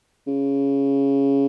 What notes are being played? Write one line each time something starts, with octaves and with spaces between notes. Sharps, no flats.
C#3